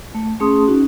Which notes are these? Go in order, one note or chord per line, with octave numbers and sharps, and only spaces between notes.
A3
A3 C#4 G#4 A5 C6 D#6
C#4 D#4 F#4